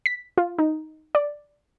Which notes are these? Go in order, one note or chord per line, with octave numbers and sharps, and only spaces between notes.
B6
F4
D#4
D5